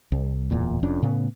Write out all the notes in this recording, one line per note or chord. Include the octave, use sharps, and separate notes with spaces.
C2
D1 E2 A#2
F1 F2 C#4 D4
A2 C#3 B3